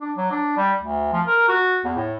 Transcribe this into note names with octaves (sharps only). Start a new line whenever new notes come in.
D4
F#3
D4
G3
D2
F3
A#4
F#4
E2
A2